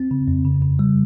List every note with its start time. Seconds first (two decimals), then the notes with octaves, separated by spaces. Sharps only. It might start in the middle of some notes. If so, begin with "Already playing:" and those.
Already playing: C4
0.11 C#3
0.28 F2
0.45 C#3
0.62 C#3
0.79 G3